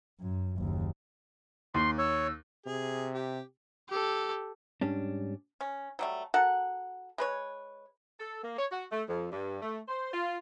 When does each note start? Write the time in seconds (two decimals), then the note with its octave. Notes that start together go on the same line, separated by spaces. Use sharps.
0.20 F#2
0.58 F#1 D#2
1.74 D#2 C6
1.98 C#5 E6
2.66 C3 G#4
3.14 G4
3.89 G4 A4
4.81 G#2 G3 C#4 D4
5.61 C#4
5.99 F#3 G3 A3
6.34 F#4 A4 A#4 F#5
7.18 G#3 B4 C#5
8.20 A4
8.43 A#3
8.57 C#5
8.71 F#4
8.91 A3
9.08 F2
9.31 G2
9.61 A3
9.88 C5
10.12 F4